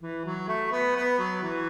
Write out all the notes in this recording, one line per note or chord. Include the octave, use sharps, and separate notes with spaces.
E3
F#3
A3
B3
B3
F#3
E3